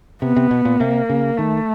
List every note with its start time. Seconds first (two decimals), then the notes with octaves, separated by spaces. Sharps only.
0.22 C3 B3
0.36 C3
0.51 B2
0.65 A#2
0.80 C3 A#3
1.09 C#3
1.38 D#3 A3